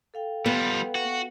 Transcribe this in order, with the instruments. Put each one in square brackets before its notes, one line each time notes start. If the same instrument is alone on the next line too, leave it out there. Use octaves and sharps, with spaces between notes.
[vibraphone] A4 F5 G5
[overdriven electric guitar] G3 F4 [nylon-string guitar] B3
[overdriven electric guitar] F#4